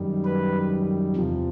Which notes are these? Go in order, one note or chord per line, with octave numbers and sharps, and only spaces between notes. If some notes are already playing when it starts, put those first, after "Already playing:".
Already playing: F#2 D#3 G3
B4
E2 C3 F3